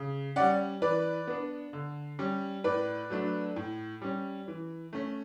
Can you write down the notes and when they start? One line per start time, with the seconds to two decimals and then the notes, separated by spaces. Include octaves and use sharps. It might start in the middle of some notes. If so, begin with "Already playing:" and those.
Already playing: C#3
0.36 G3 C#4 D5 F#5
0.82 E3 B4 D5
1.27 B3 D4
1.73 D3
2.19 G3 C#4
2.64 A2 B4 D5
3.10 F#3 A3 D4
3.56 A2
4.02 G3 C#4
4.48 E3
4.93 A3 C#4